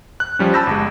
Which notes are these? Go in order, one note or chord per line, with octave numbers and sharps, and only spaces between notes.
F#6
F3 G3 C#4
A5 B5 E6 G6 A#6
G1 G#3